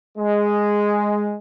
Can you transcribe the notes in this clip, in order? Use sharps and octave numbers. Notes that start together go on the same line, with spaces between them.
G#3